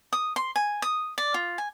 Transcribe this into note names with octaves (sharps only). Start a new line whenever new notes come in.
D#6
C6
G#5
D#6
D5
F4
G#5